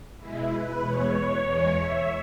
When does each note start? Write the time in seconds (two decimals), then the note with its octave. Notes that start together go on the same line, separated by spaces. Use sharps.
0.18 B2 G#3 E4
0.49 B4
0.80 E2 B2 G#3 C#5
1.43 E2 E3 G#3
1.75 E5